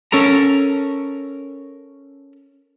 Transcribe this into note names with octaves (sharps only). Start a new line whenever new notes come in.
C#4 A4 A#4 A#5